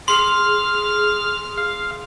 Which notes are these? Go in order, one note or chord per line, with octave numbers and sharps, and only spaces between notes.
G#4 C6 F6
F5